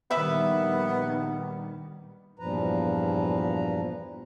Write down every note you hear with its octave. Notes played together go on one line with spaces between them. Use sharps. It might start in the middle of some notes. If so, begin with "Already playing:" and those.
A#1 D#3 G3 B3 B4 E5 B5
E2 G2 A#2 F3 B4 A#5